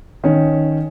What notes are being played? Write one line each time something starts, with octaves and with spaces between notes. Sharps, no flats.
D#3 C#4